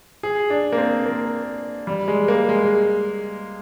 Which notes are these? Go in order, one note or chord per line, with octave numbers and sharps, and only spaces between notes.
G#4
D4
A#3
C4
A#3
G3
G#3
A#3
G#3